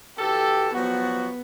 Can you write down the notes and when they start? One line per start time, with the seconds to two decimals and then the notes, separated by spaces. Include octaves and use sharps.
0.19 E3 F#4 G4 A4
0.75 F3 F#3 B3 F#4